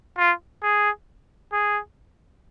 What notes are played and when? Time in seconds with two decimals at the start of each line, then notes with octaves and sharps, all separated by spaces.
0.18 F4
0.63 G#4
1.53 G#4